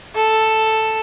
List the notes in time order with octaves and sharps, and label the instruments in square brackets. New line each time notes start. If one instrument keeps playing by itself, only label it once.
[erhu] A4